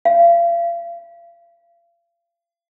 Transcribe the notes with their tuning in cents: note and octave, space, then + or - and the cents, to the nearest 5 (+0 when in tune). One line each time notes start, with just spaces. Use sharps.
F5 -40